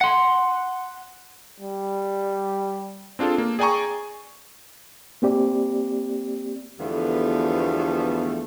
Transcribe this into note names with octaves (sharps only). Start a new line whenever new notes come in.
F#5 C6
G3
C4 D4 F4 G#4 A4
A#3
G#4 D5 G5 G#5 A#5 C#6
A#3 C4 G4 D5
E2 D3 F3 G3 A3 B3